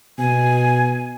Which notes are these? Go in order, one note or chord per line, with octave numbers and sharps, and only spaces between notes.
B2 G#5